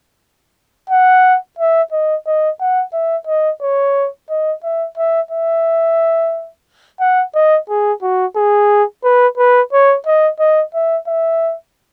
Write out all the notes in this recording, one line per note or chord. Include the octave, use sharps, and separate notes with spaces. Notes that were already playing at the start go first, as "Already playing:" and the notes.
F#5
E5
D#5
D#5
F#5
E5
D#5
C#5
D#5
E5
E5
E5
F#5
D#5
G#4
F#4
G#4
B4
B4
C#5
D#5
D#5
E5
E5